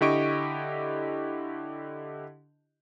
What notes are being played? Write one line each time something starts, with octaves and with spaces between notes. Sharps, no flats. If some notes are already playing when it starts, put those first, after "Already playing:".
D3 E4 G4 D#5 C#6 D7